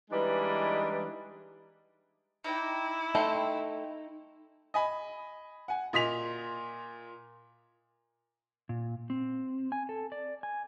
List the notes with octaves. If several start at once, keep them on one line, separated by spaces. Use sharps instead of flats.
E3 G3 G#3 D4 D#4 B4
D#4 E4 D5 G5
A3 D#4 G5 B5 C6
D#5 G#5 B5
F#5 G#5
A#2 D#5 C6 B6 F7
A#2
C4
G#5
A4
D5
G#5